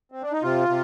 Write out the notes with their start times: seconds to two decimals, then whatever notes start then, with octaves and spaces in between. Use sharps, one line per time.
0.12 C4
0.22 D4
0.32 D#4
0.42 C3 F4
0.68 C3